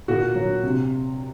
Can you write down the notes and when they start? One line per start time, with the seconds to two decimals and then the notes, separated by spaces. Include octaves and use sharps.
0.08 A#2 F#4
0.35 F#3
0.63 C3